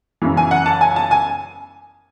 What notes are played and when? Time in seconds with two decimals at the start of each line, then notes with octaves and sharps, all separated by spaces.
0.22 F#2 C#3 E3
0.37 G#5
0.51 F#5
0.66 A5
0.81 G#5
0.96 A5
1.11 G#5